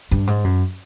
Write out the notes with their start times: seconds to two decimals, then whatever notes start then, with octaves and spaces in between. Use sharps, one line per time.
0.11 G2
0.27 G#2
0.44 F#2